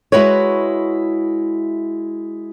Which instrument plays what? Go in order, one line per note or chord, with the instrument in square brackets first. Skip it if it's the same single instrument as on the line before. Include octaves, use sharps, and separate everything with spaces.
[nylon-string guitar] G#3 E4 F#4 B4 C#5